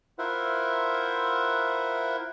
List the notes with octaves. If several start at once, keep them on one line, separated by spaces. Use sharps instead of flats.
E4 F4 A#4 C5 E5 F#5